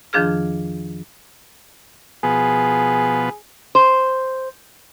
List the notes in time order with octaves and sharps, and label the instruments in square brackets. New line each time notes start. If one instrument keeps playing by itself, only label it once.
[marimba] F2 D#3 F3 D4 G#4 F6
[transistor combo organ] B2 F3 B3 [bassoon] G#4
[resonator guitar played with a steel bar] C5